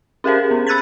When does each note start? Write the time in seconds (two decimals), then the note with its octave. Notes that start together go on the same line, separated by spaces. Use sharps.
0.24 C#4 G4 G#4 A#4 C5
0.51 B3
0.67 B5 E6 F#6 G#6 A6 B6